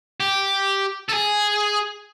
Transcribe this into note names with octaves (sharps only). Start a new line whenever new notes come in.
G4
A4
G#4